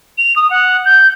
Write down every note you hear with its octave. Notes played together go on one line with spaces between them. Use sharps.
F7
D#6
F#5
G6